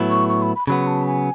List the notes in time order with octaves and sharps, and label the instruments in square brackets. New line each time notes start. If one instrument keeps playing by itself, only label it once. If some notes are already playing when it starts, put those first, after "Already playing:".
Already playing: [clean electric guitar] A2 F#3 B3 E4
[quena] C#6
C#6
B5
B5
[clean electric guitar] C#3 F#3 B3 [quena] B5
[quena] A5
G#5